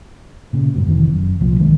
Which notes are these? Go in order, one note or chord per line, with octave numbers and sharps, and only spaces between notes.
A#2 C#3
G2 B2
F1 D#3 E3
F#2
C2 A#2 F3
D#3 G#3 D4